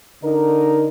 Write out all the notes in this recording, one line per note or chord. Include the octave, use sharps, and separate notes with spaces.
D3 D#4 A#4